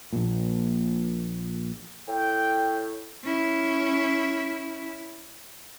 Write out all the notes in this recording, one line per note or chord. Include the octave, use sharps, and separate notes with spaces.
A#1 A#2
A2 G5
C#4 E4